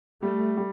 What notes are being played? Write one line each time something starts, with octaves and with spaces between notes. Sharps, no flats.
G3 A3
G3